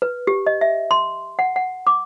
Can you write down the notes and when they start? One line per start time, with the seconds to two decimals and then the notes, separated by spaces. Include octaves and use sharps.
0.02 B4
0.27 G4
0.46 D#5
0.61 E5
0.91 C6
1.39 F#5
1.56 F#5
1.87 D6